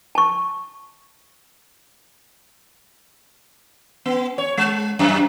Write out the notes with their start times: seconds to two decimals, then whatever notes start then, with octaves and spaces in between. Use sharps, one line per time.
0.15 A5 C#6
4.06 B3
4.38 C#5
4.57 G#3
4.99 F#2